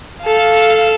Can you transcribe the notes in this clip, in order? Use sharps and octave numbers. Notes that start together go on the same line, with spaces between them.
A4 F5